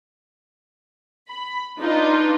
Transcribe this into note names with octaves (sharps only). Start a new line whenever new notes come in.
B5
D4 D#4 F4 B4